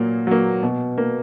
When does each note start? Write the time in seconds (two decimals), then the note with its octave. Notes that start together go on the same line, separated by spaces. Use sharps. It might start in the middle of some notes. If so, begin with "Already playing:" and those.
Already playing: A#2 F#3 A#3
0.27 F#3 A#3
0.63 B2
0.98 A#3